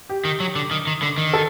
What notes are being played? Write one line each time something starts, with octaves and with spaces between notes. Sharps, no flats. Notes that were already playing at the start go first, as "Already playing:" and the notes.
G4
D#3
F#3
D3
D#3
D#3
D3
D#3
A4